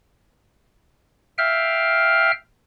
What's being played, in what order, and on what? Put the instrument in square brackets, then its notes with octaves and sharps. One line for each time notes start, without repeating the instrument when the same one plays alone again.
[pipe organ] E5 F5 G5 F6